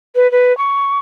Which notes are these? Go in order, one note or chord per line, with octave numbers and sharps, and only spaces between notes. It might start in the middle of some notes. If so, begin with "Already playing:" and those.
B4
B4
C#6